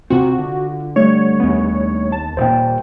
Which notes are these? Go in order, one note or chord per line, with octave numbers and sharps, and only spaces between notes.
C3 C4 F4 F#4
D3
G3 A3 D4 C#5
D#2 B3
A5
D#1 A#2 C5 G5